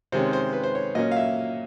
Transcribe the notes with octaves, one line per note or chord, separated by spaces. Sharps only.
C3 D#3 G#3 C#4 C5
C5
B4
C5
C#5
A#2 F#3 A#3 C#4 D#5
F5
E5